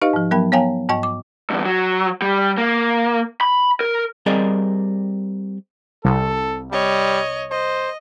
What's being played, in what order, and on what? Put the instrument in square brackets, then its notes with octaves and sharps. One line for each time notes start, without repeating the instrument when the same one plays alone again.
[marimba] D#4 G4 B4 D#5 F5
G#2 F3
F#3 B3 A#4 G5 B5
B3 C#5 F5 G5 G#5 A#5
G#2 D#5 G5 C#6
D6
[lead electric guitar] E2 G2
F#3
G3
A#3
B5
A#4
[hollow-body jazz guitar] G3 C4 G#4 A#4 D5 D#5
[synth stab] C2 [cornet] A4
[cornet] G3 [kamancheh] C#5 D#5
[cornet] C5 [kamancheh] D#5